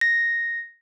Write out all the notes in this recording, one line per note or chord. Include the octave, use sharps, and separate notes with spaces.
A#6